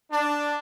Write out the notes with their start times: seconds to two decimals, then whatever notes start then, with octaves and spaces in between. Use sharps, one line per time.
0.11 D4